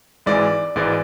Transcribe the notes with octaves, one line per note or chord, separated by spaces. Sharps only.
G#1 G#2 E3 G#3 D5
G#1 G#2 E3 G#3 D5